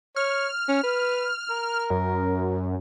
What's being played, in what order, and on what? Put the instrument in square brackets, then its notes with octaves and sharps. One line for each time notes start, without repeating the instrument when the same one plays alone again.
[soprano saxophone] C#5 [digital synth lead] F6
[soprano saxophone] C#4
B4
A#4
[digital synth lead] F#2